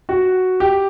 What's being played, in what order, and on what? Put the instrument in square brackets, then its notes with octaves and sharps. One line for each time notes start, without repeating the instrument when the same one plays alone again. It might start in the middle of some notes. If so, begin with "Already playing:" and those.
[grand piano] F#4
G4